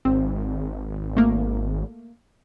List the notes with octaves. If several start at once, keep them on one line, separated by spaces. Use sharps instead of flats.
G#1 C4
A3 A#3